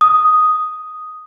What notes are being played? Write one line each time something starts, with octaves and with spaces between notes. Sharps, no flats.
D#6